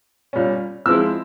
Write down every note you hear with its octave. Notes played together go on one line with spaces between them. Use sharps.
A#2 G3 C#4
F3 G#3 C4 E4 E6